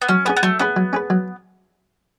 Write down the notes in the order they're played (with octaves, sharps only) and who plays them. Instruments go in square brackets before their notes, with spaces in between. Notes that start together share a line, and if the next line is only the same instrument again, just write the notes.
[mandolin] B3
[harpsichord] F#3 [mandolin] C#4
[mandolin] B3 [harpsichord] C#4 G#4 B4
[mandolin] B3
[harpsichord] F#3 [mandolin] A3
[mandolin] B3 [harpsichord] C#4 G#4 B4
[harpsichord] F#3
C#4 G#4 B4
F#3